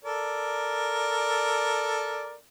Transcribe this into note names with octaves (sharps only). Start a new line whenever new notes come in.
A4 A#4 D5